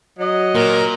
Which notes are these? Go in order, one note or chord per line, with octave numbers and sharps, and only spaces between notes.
F#3 D#5
A#2 A#4